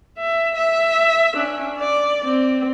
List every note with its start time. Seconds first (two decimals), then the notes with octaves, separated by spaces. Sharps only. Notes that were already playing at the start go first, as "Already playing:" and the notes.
0.18 E5
0.55 E5
1.34 C#4 D4
1.78 D5
2.24 C4